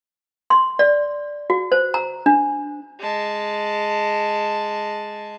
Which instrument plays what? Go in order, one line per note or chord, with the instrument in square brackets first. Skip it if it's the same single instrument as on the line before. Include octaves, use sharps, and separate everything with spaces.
[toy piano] C6
D5
F#4
C5
A#5
D4
[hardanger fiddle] G#3 A5